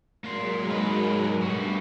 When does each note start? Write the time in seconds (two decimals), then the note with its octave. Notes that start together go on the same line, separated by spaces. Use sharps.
0.24 F#3 G#3 A#3 A#4 C6
0.68 G#2 B4
1.42 G2 B2 G3 A3 F#4